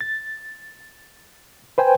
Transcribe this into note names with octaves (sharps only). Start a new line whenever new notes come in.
A6
B4 C5 G5 G#5